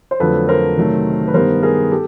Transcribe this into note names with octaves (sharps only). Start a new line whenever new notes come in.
C5
F2 D3 F#3 A3 A4 B4
A#4 C5
C3 D#3 F#3 A3
B4
G2 D#3 G3 B3 A#4 C5
G#4 A#4
G4 A4